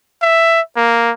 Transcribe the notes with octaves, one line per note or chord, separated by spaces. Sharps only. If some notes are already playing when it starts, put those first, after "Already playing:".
E5
A#3